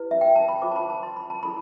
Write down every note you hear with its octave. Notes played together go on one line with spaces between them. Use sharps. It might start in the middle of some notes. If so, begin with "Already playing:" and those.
Already playing: E4 G4 B4
E5
G5
A5
B5
F4 A4 C5 D6
A5
B5
A5
C6
B5
A5
E4 A4 B5